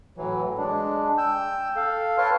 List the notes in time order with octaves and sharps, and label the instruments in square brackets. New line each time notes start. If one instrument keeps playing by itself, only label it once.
[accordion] A2 E3 F#3
G#3 D4
G5 E6 G6
A4 F5
B4 C#5 F5 G5 A5 C6